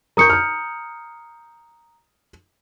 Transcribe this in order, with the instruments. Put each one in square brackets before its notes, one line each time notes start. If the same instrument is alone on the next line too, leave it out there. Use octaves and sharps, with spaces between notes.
[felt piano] A#4 C#6 G6 [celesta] A#5 D#6 C#7
[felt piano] F6 G6